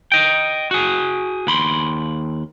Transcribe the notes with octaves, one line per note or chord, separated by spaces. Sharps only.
D#5 G5
F#4 G#4
D#2 B5 C6